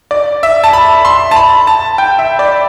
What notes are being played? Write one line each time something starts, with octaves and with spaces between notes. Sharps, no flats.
D5
E5
A5
B5
C6
A5
B5
A5
G5
E5
D5